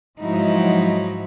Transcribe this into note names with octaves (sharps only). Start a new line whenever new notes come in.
G#2 F3 F#3 D#4 E4 F#4